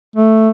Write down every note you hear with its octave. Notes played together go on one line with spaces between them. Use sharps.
A3